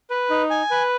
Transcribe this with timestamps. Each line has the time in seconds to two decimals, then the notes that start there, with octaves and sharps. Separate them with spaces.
0.10 B4
0.30 D#4
0.50 G#5
0.71 B4